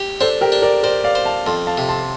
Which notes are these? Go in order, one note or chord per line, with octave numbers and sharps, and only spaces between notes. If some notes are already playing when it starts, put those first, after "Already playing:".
Already playing: G4
D4 A4 C5
G4 A#4
D4
A#4 D5
A#4 C5 D5
D5 F5
C5
F5 A5
F2 A5 C6
F5 A5
C3
A5 C6